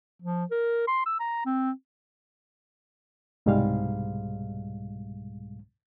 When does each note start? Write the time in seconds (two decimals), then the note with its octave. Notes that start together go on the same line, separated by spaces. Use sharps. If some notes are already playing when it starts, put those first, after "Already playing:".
0.22 F3
0.51 A#4
0.88 C6
1.06 E6
1.20 A#5
1.46 C4
3.46 C2 G#2 B2 G3 G#3 F5